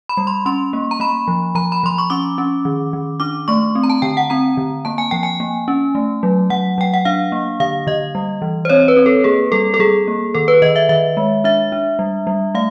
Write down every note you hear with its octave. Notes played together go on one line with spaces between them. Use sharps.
B5
G3
C6
C#4 C6
A#3
A#5
A#3 B5
F3
F3 A#5
B5
F3 C6
C#6
C#4 D6
C#4
D#3
D#3
D4 D6
A3 C#6
C4
A#5
A5
D3 G5
F#5
C4 A#5
D3
A#3 A5
G#5
F3 G5
G#5
A#3
C#4
A3
F#3
F#3 F#5
F#3 G5
F#5
D4 F5
A#3
D3 F5
D3 D#5
G3
E3
C5
C4 C#5
B4
C4
A4
A#3 G#4
G3 A4
A4
G3 G#4
A#3
D#3 A4
B4
D#3 D#5
E5
D#3 E5
G#3
D4 E5
D4
G3
G3
A3 F5